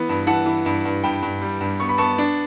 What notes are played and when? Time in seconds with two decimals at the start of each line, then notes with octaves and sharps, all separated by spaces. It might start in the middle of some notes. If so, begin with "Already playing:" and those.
Already playing: E3 B3
0.09 G2
0.27 E3 F#5 A5
0.46 E3
0.66 G2
0.85 G2
1.03 G2 G5 B5
1.22 G2
1.42 G3
1.61 G2
1.80 B3 C#6
1.89 B5
1.98 B3 A5 C#6
2.18 D4